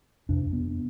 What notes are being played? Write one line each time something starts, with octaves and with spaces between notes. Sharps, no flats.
F2 C3 D4
B3